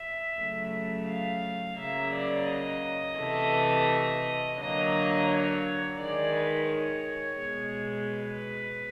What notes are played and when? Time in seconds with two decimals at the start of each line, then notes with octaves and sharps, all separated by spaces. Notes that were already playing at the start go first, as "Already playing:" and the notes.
Already playing: E5
0.40 C#3 F#3 A3
1.10 F5
1.80 C#3 F#3 A#3 E5
2.15 D5
2.49 D#5
3.20 C3 E3 A3
4.60 D3 F#3 A#3 D#5
5.30 C#5
5.99 D#3 G#3 D5
6.35 B4
6.70 C#5
7.39 B2 G#3
8.09 B4